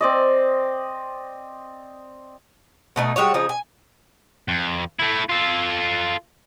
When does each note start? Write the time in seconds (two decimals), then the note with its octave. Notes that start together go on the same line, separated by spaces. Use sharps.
0.01 C4 D5 D#5
2.96 B2 A3 D#4
3.16 G3 G#3 F#4 C#5
3.34 C#3 F3 D#4 G#4
3.49 G#5
4.48 F2
4.99 A3 E4
5.29 F4 A4